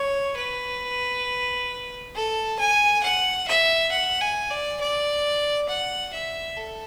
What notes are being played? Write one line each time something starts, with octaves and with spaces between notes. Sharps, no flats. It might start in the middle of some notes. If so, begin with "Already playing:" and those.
Already playing: C#5
B4
A4
G#5
F#5
E5
F#5
G#5
D5
D5
F#5
E5
A4